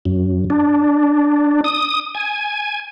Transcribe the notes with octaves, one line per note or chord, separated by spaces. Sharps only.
F#2
D4
D#6
G#5